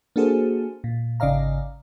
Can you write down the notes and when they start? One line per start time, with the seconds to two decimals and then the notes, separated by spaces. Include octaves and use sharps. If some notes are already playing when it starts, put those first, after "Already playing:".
0.16 A#3 D4 F#4 G#4 A4 C5
0.84 A#2
1.20 G#1 C#3 D5 D#5 F5 A#5